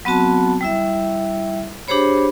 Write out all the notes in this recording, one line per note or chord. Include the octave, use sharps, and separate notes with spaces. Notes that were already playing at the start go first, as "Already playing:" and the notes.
F#3 B3 C4 F#4 A5
G3 E4 E5
D4 G4 G#4 C5 C#5 B5